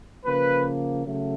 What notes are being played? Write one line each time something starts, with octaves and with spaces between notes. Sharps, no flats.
C#3 F3 A#3 B4
C#3 F#3 A3